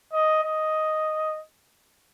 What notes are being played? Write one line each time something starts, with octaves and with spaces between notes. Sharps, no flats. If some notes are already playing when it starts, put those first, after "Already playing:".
D#5
D#5